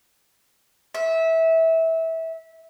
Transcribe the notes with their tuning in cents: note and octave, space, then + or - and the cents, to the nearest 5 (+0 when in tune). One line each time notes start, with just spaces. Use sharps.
E5 -20